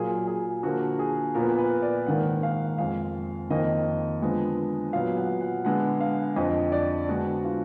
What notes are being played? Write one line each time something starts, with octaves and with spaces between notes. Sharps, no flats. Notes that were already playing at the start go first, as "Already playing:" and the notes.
Already playing: A#2 F#3 A#3 G#4
G#4
D3 F3 A#3 F#4
G#4
A#2 F3 B3 A#4
B4
D5
G#2 D#3 A#3 F#5
F5
F2 F3 G#3 F5
F2 D#3 A#3 D#5
D3 F3 G#3 B3
A#2 F#3 B3 F5
F#5
F#5
D3 G#3 B3 F#5
F5
F2 D3 F3 D#5
D5
D3 G#3 B3 F#4
F4